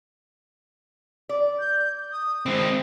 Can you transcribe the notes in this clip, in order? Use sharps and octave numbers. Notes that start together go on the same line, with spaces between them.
D5
G6
D#6
E3 G#3 C4